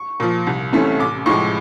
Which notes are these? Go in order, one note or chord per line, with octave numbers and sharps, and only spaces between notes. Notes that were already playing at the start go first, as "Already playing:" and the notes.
Already playing: C#6
A#2 F3
C2
C3 E3 A3 C#4
A1 D6
A2 F3 G#3 C#6